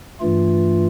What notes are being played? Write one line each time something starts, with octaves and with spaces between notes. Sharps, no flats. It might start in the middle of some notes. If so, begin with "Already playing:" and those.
G2 E3 A3 F4